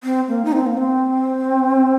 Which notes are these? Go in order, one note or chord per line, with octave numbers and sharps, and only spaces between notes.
C4
A#3
D#4
C4
A#3
C4